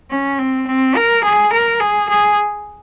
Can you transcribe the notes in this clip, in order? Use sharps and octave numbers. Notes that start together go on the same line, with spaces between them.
C#4
C4
C4
A#4
G#4
A#4
G#4
G#4